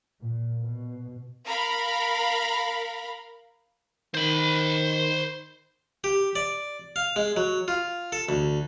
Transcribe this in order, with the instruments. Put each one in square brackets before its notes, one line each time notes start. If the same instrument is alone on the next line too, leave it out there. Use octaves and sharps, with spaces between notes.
[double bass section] A#2
B2
[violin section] A#4 F5 B5
[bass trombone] D#3 [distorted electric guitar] C5 B5
[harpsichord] G4
D5
F5
G#3
F#3
F4
A4
D2